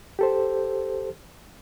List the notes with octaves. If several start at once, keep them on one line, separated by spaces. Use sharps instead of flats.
G4 A4 C5